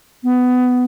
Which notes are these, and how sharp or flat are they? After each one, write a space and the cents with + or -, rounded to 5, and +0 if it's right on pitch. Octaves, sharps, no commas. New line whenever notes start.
B3 +15